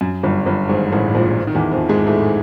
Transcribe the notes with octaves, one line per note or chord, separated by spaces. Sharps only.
F#2
G1 G2
G1 G2
G#1 G#2
A1 A2
A#1 A#2
D#3
E2 E3
F2 F3
G#2 G#3
A2 A3